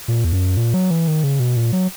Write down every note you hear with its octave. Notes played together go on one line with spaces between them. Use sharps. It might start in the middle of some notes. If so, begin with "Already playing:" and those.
A#2
E2
F#2
A#2
F#3
E3
D#3
C#3
B2
A#2
F#3